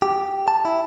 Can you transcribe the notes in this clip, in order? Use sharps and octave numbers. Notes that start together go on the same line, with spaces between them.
G4
A5
E4